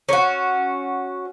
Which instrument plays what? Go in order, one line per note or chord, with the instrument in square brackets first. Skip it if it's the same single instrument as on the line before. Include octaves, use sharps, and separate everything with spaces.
[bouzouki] C#4 F#4